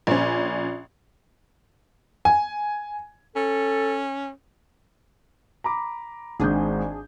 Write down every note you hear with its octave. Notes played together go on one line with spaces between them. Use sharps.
A#1 C#4
G#5
C#4 A4
A#5 B5 D6
G#1 G#2 D4 G#4 G6